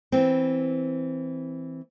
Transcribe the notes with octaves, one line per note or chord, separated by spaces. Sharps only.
E3 C4